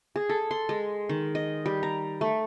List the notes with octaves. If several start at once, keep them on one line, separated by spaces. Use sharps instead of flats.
G#4
A4
C6
G#3
D#3
D#5
G3
A#5
A3